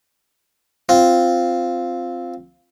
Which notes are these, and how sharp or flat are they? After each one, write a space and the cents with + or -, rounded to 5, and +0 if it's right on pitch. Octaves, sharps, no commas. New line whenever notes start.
C4 +0 F4 +0